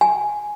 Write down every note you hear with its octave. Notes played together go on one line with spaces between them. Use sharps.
G#5